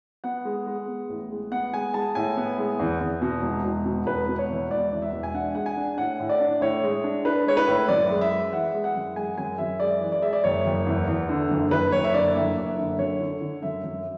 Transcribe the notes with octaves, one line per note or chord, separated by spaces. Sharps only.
B3 F#5
G#3
G#3
B3
A1
G#3
B3 F#5
G#3 G#5
G#3 A5
A2 G#5
B3
G#3
E2
E2
B2
E1
E1
B2
E1 B4
B2
C#5
E2
E1 D5
E2
E5
E1
G#5
D4 F#5
G#3 F#5
G#5
D4
A2 F#5
A2
D5
D4
A2 C#5
G#3
D4
D4 B4
G#3 C#5
B4
A2
F#2 D5
G#3
E5
G#3
E3 F#5
G#3
F#5
F#2
G#3 G#5
F#2 G#5
F#2 E5
G#3 D5
E3
D5
G#3 E5
D5
F#1 C#5
F#1
E2
E2
D3
F#1
F#1 B4
F#1 C#5
E5
D3 D5
F#1 E5
F#1
D3
F#2 C#5
D3
D3
F#2 E5
F#2